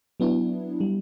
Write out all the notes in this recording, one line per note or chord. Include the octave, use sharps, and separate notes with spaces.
F#3 B3 D4 E4
G3